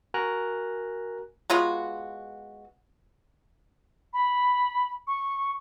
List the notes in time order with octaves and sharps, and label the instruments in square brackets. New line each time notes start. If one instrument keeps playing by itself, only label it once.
[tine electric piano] F#4 A#4 G#5 A#5 F#6
[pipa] G#3 B3 F4 F#4
[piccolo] B5
C#6